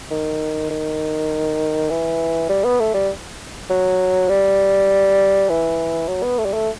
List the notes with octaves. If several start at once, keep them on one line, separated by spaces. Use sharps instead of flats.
D#3
D#3
E3
G3
B3
A3
G3
F#3
G3
E3
F#3
B3
A3
G3
A3